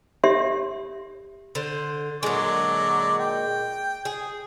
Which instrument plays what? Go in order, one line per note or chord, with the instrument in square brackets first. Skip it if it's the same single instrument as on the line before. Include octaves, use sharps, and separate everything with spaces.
[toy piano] G4 E5 C6
[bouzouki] D3 C5
[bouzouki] A#2 G#3 [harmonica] D3 F#3 D5
[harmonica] G5
[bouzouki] G#4